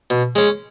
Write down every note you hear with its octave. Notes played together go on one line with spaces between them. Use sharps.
B2
G#3 C#4